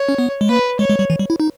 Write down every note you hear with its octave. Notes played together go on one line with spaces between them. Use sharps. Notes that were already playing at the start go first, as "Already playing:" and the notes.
Already playing: C#5
C#4
B3
G#3
A#3 B4
G#3 C#5
G#3
G3
E3
G3
E4
D#4